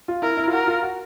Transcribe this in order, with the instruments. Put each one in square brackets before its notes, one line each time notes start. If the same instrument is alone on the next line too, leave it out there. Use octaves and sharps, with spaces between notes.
[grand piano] F4
[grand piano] E4 [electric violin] A#4
[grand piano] E4
F4
[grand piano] F#4 [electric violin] A#4
[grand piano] F4
F#4